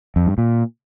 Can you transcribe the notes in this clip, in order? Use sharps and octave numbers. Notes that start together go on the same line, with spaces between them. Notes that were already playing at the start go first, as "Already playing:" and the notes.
F2
G2
A#2